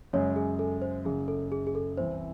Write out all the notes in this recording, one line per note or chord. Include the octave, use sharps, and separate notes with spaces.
F#2 C#3 G#3 C#5
G#4
A4
C5
F#1 F#2 C#3 G#4
A4
G#4
G#4
A4
C2 C3 E3 C4 C5